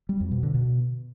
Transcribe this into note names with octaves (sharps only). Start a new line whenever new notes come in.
G3
F2
B2
D3
B2